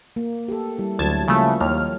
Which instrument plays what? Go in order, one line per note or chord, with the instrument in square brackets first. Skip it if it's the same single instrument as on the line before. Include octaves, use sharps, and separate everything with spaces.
[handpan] A#3
G4 A4
G3 E4
[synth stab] D2 A5 G#6 [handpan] F#3 E4
[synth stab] C#3 A3 [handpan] F3 G3 A#3
[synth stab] D#2 F6 [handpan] C#5